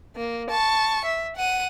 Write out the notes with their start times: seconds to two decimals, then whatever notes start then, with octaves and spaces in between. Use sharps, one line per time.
0.16 A#3
0.50 A5 C#6
1.05 E5
1.36 F#5 D#7